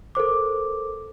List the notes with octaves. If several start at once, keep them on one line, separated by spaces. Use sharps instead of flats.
A4 A#4 C5 D6